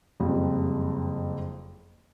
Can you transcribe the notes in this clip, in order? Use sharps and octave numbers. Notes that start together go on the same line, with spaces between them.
F#1 F2 G3